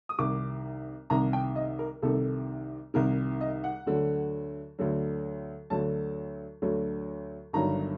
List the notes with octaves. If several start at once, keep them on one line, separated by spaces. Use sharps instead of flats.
D#6
C2 C3 D#3 D6
C2 C3 D#3 A#5
G5
D#5
A#4
C2 C3 D#3 A4
C2 C3 D#3 A#4
D#5
F#5
D2 D3 F#3
D2 D3 F#3
D2 D3 F#3 A5
D2 D3 F#3
G1 G2 D#3 F#3 A#5